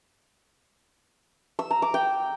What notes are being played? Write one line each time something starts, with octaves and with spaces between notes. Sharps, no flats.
E6
A#5
D6
G5